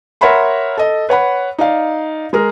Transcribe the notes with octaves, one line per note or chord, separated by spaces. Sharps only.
A#4 C#5 E5 F#5 B5 C6
A4 D#5
B4 C#5 F#5 B5
D#4 D5 F5
G#3 G#4 A#4